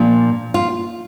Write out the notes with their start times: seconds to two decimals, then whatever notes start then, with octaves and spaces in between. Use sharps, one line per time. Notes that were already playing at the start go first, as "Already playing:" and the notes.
Already playing: A#2 F3 A#3 D4
0.54 F4